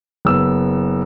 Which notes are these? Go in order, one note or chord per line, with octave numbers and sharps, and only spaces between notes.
F#1 B3 E6